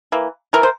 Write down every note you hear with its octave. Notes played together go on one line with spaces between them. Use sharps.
E3 A#3
E3 A3 A#4
C5